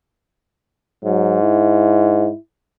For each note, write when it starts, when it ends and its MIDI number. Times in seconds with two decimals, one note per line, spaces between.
1.05 2.29 44
1.05 1.40 54
1.42 2.37 64